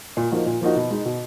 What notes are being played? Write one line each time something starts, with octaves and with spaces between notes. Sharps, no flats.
A#2
F3 A#3 D#4 F#4
A#2
F3 A#3 D#4 F#4
B2
G#3 D#4
B2